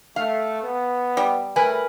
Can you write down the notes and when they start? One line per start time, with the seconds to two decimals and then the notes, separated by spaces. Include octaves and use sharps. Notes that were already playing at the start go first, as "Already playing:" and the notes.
0.16 A3 F5
0.62 B3
1.17 G3
1.56 A2 A3 A#4 B4 G#5